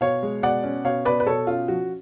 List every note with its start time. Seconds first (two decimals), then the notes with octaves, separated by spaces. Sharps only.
0.01 B2 C#5 F5
0.23 G#3
0.42 B2 D5 F#5
0.63 C#4
0.84 B2 C#5 F5
1.05 B2 B4 D5
1.20 B4
1.27 B2 A4 C#5
1.47 C#4 F4
1.68 F3 F#4